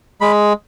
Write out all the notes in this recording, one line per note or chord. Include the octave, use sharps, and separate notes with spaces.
G#3 B5